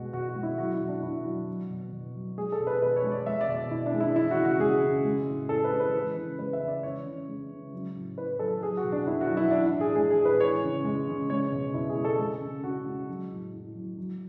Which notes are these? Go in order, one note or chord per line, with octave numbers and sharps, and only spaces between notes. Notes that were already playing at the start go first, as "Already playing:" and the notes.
Already playing: B2 G#3 F#4
B2 F#4
F#4
G#3
E4
F#3 F#4
E4
B2
D4
B2 E4
F#3 F#4
F#3
B2
B2
F#3
G#3 G#4
A4
B2
B4
B2 B4
C#5
G#3
D5
G#3 E5
D5
B2
D5
B2 E4
D4
G#3
E4
E3 E4
F#4
C#3
F#4
G#3 G#4
C#3
G#3
A2
A2 A4
B4
G#3
B4
E3
C#3
G#3 B4
E5
C#3
D5
E3 C#5
C#3
G#3
C#3
F#3
A2
A2 B4
F#3 A4
F#3 G#4
F#4
B2
D4
B2 E4
F#4
F#3
E4
E3 D4
E4
A2
G#4
G#3 G#4
G#4
A2
B4
E3 C#5
C#3
G#3
C#3
G#3 C#5
B2
B2 E4
G#4
G#3
A4
G#3 A4
C#3
C#3 F#4
G#3
F#3
A2
A2
F#3
F#3